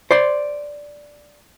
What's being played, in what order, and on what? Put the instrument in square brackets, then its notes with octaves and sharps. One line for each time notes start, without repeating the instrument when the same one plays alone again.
[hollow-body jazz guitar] C5 D5 C6